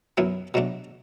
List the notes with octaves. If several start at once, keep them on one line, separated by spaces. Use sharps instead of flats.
F#2 F#3 B3 E4
B2 F#3 A3 D4